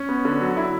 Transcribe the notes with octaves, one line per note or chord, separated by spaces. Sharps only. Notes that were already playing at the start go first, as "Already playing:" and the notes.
Already playing: C#4
B3
D3
F#3
E4